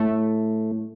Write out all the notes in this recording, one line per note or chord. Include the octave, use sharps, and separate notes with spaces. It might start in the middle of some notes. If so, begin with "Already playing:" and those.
Already playing: A2 A3